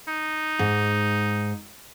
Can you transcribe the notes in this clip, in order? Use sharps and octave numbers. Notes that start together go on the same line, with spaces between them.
D#4
G#2